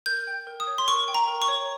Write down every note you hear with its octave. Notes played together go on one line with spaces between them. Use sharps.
A#4 G6
G5
A#4
D#6
C#5
C6
A#4 C#6
G5
A#5
A#4
C#6
C#5